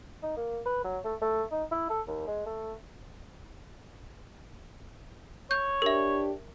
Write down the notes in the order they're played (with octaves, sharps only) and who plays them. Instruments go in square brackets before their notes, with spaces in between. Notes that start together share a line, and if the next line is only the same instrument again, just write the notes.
[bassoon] D#4
A#3
B4
F#3
A3
A3
D#4
E4
A4
D#2
G#3
A3
[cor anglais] C#5 [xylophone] G6
[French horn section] D4 G4 [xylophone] A#4 E5